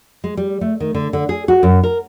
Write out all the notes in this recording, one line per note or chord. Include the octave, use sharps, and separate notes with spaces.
G#3
G3
A3
D#3
D3
D3
G#4
F#4
F#2
A#4